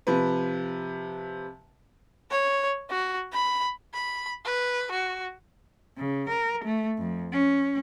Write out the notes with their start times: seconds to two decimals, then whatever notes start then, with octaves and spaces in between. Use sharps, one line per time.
0.07 C3 F3 B4
2.31 C#5
2.90 F#4
3.33 B5
3.94 B5
4.45 B4
4.91 F#4
5.97 C#3
6.29 A#4
6.64 A3
6.98 F2
7.32 C#4